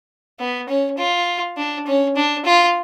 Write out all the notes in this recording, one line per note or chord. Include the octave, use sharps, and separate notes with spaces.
B3
C#4
F4
D4
C#4
D4
F4